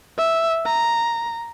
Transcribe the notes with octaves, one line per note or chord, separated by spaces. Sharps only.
E5
A#5